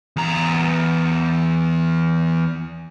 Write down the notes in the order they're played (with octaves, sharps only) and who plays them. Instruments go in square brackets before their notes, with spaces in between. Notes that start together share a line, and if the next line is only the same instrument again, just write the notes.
[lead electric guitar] E2 A#5